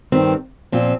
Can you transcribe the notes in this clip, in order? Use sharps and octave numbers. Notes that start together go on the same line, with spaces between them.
G2 D#3 C4
A#2 F3 C4